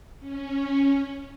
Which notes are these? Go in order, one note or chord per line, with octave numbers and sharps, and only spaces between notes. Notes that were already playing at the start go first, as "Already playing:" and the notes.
C#4